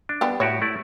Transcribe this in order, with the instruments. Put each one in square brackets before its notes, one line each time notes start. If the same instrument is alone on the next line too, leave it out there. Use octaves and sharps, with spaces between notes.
[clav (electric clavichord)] D4
[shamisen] G3 B3 G4
[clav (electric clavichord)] A2 F#4 G4 [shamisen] C#5
[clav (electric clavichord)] A3 E4 D5